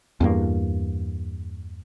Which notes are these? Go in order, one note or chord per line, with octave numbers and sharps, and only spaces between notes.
E2 G2 A#3